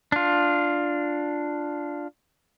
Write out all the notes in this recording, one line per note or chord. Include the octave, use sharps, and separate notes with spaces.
D4 F4